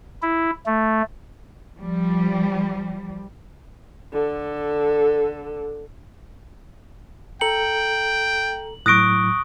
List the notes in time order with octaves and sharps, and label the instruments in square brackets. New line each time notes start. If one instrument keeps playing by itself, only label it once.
[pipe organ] E4
A3
[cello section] F3 G3
[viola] D3 A4
[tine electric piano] A4 A#5 C#7 [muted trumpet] G5 [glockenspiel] F#7
[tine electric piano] A2 F#3 [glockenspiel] C#6 D#6 [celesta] F#6 A#6 D7